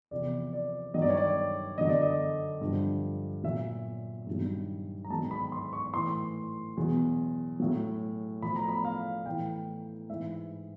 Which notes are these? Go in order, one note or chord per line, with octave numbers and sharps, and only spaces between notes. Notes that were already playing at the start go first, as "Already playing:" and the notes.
E2 C3 F3 D5
D5
G2 D#3 F#3 D#5
D5
C#5
D5
F#2 D3 F#3 D#5
D5
D#5
G2 D3 F3
A#2 F#3 E5
G2 D#3 F#3
A#5
G#2 D#3 F#3 A5
B5
C6
C#6
A2 E3 C6
E2 B2 F#3
A2 F#3
A2 F3 B5
A#5
B5
F5
A2 E3 G5
G#2 E3 E5